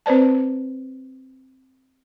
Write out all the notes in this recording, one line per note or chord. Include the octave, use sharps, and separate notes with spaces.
C4 B4 C5 D5 A5